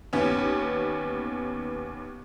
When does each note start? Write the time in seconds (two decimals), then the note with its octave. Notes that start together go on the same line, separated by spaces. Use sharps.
0.13 D#2 B3 C#4